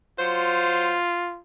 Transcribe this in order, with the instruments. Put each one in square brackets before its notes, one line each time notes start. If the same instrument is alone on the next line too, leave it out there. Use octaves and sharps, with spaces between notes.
[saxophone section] F#3 C5 [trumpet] F4